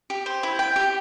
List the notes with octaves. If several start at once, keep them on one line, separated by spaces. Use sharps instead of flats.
G4
C5
E4
G5
G4